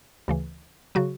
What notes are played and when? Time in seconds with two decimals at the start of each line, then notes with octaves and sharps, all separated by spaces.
0.28 D2 C#3 E3
0.95 C#3 F#3 F#4